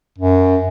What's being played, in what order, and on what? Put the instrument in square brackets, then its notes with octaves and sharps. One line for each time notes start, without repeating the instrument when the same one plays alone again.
[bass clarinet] F#2